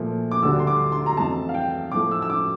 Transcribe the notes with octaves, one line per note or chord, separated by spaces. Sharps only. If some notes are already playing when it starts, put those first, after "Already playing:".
Already playing: A#2 F3 A3
D6
D2 D3 G3 E6
C6
D6
C6
A#5
F2 E3 A3 A5
F5
G5
A2 F3 A3 D6
E6
E6
D6